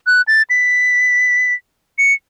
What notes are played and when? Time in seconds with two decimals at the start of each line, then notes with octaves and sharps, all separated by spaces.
0.07 F#6
0.27 A6
0.50 B6
1.98 C#7